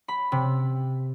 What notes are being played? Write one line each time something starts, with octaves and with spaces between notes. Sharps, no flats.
B5
C3